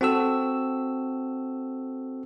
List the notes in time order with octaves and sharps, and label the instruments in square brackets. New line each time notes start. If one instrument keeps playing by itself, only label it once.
[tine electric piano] C4 F#4 A4 E6